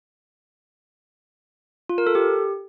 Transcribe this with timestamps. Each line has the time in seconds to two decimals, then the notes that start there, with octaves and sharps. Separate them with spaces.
1.89 F4
1.98 A#4
2.07 A4
2.15 G4